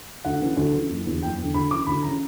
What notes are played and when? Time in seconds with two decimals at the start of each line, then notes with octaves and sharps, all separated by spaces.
0.25 D2 F#5
0.41 C#3 E3
0.57 D2
0.74 C#3 E3
0.90 F#1
1.06 E2 D3
1.22 F#1 G5
1.38 E2 D3
1.54 D2 B5
1.71 C#3 E3 D6
1.87 D2 B5
2.03 C#3 E3 A#5